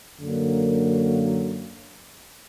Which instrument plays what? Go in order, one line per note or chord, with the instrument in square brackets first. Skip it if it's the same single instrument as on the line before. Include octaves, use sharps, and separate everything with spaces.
[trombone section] F#2 D3 F#3 A#3